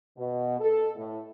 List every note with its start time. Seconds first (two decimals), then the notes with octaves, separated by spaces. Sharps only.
0.17 B2
0.60 A4
0.96 A2